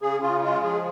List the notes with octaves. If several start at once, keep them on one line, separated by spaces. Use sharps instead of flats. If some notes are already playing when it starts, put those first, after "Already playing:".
C#3 G#4
C#3 F4
G#3 F4
F3 G#4